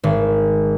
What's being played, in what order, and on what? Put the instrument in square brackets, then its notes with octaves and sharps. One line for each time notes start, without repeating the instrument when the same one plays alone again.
[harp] G#1